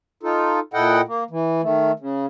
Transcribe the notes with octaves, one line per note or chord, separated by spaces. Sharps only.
D#4 F4 A4
A#2 E4 A4 D#5 F#5 G5
A#3
E3
D#3 A3
C#3